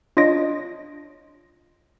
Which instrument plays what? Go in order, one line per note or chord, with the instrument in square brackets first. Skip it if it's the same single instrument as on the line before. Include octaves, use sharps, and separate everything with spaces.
[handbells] D4 F4 C#5 D#5 A#6 D7